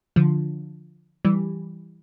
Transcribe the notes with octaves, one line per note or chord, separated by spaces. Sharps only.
D3 F3
E3 G3